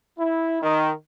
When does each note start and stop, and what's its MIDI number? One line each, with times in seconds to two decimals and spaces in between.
0.18 0.61 64
0.62 0.93 51